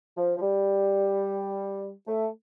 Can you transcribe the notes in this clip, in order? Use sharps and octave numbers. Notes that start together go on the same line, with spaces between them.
F3
F3
G3
A3